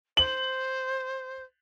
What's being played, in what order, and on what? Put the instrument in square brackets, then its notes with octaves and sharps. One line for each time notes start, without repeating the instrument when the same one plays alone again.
[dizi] C5 [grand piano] F#7